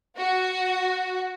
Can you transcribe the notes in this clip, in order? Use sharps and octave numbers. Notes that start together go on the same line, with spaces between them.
F#4